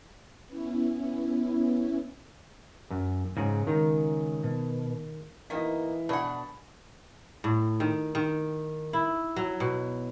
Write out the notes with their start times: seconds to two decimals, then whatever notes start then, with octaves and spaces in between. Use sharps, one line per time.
0.47 B3 C#4 E4
2.91 F#2
3.37 G#2 C#3 F#3 G#3
3.67 D#3 A#5
4.44 B2
5.50 B2 D#3 E3 A#3 D#5 B6
6.09 B2 D4 C5 F#5 G#5 B5
7.44 A2
7.80 D#3
8.15 D#3
8.93 E4
9.36 F#3
9.60 B2